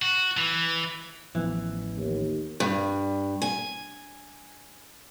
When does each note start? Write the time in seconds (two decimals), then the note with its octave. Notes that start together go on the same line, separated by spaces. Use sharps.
0.02 F#4
0.37 E3
1.35 A1 E3 F3 B3
1.97 D#2
2.60 G2
3.42 G#5